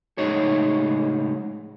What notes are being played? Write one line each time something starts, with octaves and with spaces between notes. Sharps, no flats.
C#2 A2 G#3 D#4 C#5